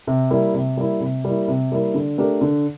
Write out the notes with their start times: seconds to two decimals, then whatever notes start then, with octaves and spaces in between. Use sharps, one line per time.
0.07 C3
0.31 G3 A#3 E4
0.54 C3
0.77 G3 A#3 E4
1.01 C3
1.25 G3 A#3 E4
1.48 C3
1.72 G3 A#3 E4
1.95 D3
2.18 A3 D4 G4 A#4
2.41 D3